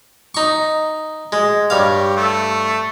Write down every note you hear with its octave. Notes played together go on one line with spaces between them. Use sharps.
D#4 C#6
G#3
G2 G4 C#5 F5
A3